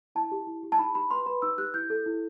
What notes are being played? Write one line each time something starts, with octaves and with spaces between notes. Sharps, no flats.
E4 A5
G4
E4
G4
A5
D#4 B5
G4 B5
B4 C6
B4 B5
D#4 E6
G4 F#6
E4 G6
A4
E4